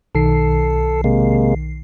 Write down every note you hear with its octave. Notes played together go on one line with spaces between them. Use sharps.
B1 D#3 A4 C7
C3 G#3 A#3